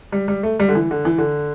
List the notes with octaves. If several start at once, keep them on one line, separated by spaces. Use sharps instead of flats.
G3
G3
A3
G3
D3
E3
D3
E3
D3